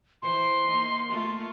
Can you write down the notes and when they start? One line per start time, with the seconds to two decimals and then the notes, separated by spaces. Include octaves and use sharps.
0.22 E3 C5 C6
0.68 A#3 D#4
1.09 A3 A#3 F4